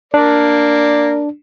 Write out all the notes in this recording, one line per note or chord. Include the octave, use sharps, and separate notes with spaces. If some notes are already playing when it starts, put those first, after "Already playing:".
A#3 D4 A#4 D5